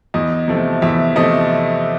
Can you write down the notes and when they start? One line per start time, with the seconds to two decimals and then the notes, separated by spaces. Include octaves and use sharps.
0.14 E2 D#5
0.48 C3 F3 A3
0.82 E2 E5
1.16 C3 F3 A3 D#5